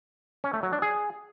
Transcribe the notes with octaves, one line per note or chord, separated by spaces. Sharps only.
C#4
A3
F#3
D4
G#4